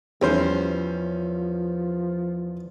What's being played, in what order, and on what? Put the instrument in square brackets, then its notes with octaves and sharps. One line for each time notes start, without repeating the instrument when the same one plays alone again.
[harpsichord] E2 [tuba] F3 [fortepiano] G3 C#4 C5